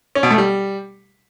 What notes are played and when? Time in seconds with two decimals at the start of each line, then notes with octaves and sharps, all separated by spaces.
0.15 C#4
0.23 B2
0.30 A3
0.38 G3